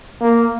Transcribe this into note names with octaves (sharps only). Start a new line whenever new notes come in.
A#3